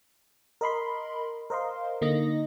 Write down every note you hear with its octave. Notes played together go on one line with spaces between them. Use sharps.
A#4 D#5 B5 C6
A#4 C5 D#5 F5 C6
D3 A#3 D#4 D#5 A#6